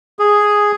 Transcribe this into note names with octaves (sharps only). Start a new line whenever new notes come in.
G#4